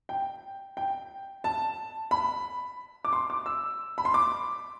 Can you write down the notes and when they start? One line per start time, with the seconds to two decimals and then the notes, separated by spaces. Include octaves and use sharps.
0.09 G5
0.77 G5
1.44 A5
2.11 B5
3.05 D6
3.13 C6
3.30 D6
3.46 E6
3.98 B5
4.05 C6
4.14 D6